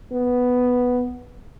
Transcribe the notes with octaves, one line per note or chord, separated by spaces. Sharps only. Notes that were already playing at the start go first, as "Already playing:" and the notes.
B3